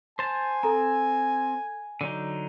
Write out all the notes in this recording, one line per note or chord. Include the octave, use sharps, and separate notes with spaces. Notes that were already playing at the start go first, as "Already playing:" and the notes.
C5 G#5 A5
C4 A4 A#5
D3 F#3 D#4